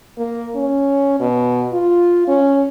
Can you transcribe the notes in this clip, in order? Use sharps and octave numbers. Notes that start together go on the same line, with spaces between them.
A#3
C#4
B2
F4
C#4